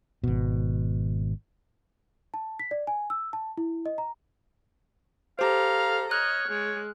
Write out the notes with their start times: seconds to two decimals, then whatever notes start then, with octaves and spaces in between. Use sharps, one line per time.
0.24 G#1 B2
2.34 A5
2.59 B6
2.71 D5
2.87 G#5
3.10 E6
3.33 A5
3.58 E4
3.86 D#5
3.98 A#5
5.39 G4 A4 C5 F5 A#5
6.11 C#5 D#5 F6 F#6
6.48 G#3 C#5